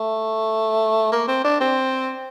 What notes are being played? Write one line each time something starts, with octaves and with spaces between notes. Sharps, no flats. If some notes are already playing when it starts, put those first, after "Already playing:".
Already playing: A3
A#3
C4
D4
C4